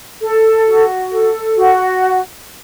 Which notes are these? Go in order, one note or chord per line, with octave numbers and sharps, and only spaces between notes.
A4
F#4
A4
F#4